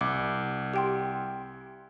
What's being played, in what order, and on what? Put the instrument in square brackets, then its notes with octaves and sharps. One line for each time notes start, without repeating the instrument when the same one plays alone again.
[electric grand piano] C2 [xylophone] D6
[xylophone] G4 G5 C6